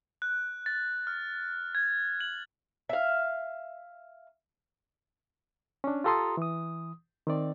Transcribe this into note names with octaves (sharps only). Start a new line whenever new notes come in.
F#6
A6
F6
G#6
F#7
E5 F5
C#4 D4
F4 G4 A4 A#5 C6 D#6
E3 D#6
D#3 C4 D5